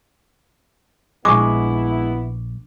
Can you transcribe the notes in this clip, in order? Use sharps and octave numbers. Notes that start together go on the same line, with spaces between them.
A#1 G#3 B3 D4 E4 C#6 D6